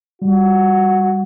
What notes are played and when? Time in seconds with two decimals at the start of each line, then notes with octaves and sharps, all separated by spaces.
0.22 G3 F#4